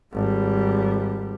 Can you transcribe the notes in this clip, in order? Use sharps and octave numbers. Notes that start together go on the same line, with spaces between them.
G#1 G3